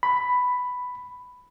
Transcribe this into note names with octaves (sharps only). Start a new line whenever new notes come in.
B5